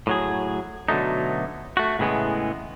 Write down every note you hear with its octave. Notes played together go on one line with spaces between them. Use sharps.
A2 F#3 G#4
B2 D3 F#3 A3 D#4
A3 F#4
A2 C#3 E3 G#3 B3